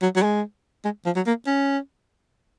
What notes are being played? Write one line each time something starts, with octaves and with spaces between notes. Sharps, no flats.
F#3
F#3
G#3
G#3
F3
F#3
A#3
C#4